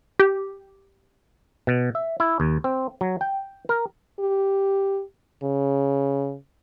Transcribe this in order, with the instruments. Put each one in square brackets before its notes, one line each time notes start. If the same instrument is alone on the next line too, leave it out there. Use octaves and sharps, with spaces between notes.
[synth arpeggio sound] G4
[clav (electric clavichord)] B2
E5
E4
D#2
C4
F#3
G5
A#4
[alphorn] G4
C#3